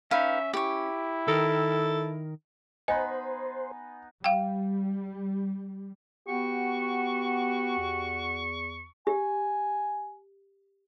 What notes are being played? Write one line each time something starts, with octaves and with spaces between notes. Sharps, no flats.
C#4 D#4 B4 E5 F5
E4 G4 C#6
D#3 A4 A#4
B3 D#4 C5 D#5 G#5 B5
G3 F5 G5
B3 F#4 G4 C#6
E2
G4 G#5